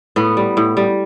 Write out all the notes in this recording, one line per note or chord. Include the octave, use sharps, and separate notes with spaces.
A2 B3
G3
A2
G3